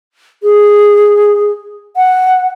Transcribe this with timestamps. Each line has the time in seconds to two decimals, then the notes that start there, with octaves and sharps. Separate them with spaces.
0.43 G#4
1.97 F#5